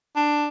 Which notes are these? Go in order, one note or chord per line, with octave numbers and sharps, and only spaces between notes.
D4